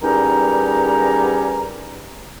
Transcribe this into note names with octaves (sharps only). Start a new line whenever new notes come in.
E2 G3 C#4 D#4 A#4 A#5